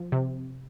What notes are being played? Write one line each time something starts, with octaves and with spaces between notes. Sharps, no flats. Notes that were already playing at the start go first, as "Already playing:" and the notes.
Already playing: F3
C3